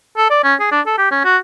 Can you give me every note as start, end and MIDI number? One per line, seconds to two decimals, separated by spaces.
0.17 0.30 69
0.30 0.43 74
0.44 0.55 61
0.60 0.70 68
0.72 0.81 62
0.86 0.94 69
0.98 1.10 67
1.11 1.23 61
1.25 1.37 66